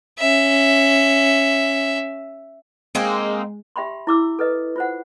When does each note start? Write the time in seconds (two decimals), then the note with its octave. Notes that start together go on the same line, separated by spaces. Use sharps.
0.19 C#4 E5
2.95 G#3 A#3 C4 D#4
3.76 G4 E5 G5 B5 C6
4.07 E4 D6 E6
4.39 A4 B4 D#5
4.76 F4 C5 F#5